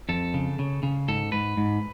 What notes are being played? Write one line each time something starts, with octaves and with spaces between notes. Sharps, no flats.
F2 A4
C#3
C#3
C#3
G#2 A4
G#2 B4
G#2